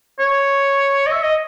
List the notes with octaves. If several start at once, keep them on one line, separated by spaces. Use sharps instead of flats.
C#5
D#5
E5
D#5